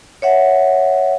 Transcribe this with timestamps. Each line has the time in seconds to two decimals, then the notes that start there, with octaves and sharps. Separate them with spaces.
0.22 C#5 E5 F#5